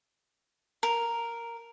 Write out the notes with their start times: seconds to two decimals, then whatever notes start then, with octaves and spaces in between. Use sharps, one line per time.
0.83 A#4